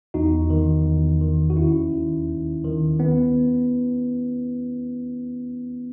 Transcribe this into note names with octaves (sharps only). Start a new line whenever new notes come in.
E2 D#4 F#4
D#3
E2
D#3
F#4
D#2 C#4 E4
D#3
D#2
D#3
B3